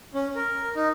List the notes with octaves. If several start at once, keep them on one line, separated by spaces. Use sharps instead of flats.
C#4
A#4
D#4